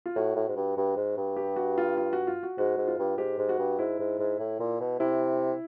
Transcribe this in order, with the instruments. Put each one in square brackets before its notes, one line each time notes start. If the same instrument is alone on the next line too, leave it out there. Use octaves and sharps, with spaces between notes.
[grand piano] F4
[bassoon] A2 [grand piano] F#4
[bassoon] A2
G#2
G2
G2
G#2
G2
[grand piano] G4
F#4
F4
F4
F#4
F4
F#4
[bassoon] G#2 [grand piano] F#4
[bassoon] G#2
[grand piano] F4
[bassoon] G2
[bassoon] G#2 [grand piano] G4
[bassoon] G#2
[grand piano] F#4
[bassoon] G2
[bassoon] G#2 [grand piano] E4
[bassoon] G#2
G#2
A2
A#2
B2
[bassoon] C3 [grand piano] E4